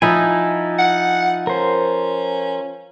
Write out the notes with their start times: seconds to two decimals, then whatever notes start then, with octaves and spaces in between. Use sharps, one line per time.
0.02 F3 D#4 E4 G#5
0.78 F#5
1.47 C#4 A#4 C5